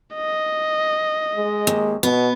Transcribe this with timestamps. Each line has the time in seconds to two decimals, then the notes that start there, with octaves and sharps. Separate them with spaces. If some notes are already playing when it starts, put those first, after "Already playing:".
0.15 D#5
1.35 G#3
1.67 D#2
2.03 B2 B3